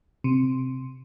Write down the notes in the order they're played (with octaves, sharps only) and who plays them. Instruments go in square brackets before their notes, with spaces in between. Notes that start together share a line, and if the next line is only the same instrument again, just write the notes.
[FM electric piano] C3